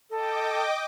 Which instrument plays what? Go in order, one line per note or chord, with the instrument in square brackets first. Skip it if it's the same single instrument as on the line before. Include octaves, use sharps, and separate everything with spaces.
[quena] A4 [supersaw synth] D#5 G5 D6